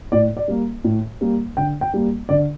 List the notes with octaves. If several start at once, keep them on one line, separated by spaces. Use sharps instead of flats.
A2 D5
D5
G3 A#3
A2
G3 A#3
D3 G5
G5
G3 A#3
D3 D5